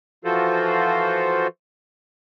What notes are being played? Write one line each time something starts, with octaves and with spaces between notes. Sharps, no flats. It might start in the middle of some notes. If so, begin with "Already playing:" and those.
E3 F3 F4 F#4 A4 C5